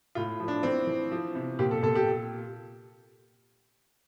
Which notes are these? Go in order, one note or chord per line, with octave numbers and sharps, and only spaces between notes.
A2 F4
F3
D4
E3 C4
E3
F3
C3
A#2 G4
A4
A#2 A4
G4